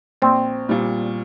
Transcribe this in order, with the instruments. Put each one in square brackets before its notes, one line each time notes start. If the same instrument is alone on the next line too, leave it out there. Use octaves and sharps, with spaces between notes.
[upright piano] A#1 [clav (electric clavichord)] C4
[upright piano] A#2 G3